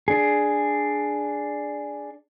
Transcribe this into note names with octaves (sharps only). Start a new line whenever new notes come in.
D4 G#4